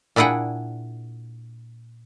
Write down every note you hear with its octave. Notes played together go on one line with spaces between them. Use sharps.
A#2 D4 E4 G#4 F#5 G5